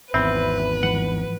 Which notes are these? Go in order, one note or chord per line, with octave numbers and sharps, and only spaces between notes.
G#1 E2 C4 B4 E5 B5
G#2 E3 F3 F#5